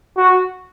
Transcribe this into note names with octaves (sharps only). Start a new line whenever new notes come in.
F#4